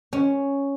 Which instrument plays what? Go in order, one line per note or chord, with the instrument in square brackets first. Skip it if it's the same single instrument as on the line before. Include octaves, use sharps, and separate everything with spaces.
[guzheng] C#4